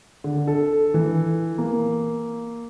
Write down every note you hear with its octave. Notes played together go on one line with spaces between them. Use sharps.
D3
A4
E3
A#3